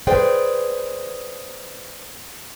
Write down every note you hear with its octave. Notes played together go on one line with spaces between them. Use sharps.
G#4 B4 C5 D5 G5